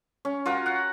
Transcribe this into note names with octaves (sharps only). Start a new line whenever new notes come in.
C#4
F4 F#4 A#4
F#5